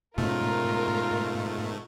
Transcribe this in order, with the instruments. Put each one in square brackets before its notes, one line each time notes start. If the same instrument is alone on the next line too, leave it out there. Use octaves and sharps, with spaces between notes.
[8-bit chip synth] G#2 A3 [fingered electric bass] B2 C#4 [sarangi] F4 [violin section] A#4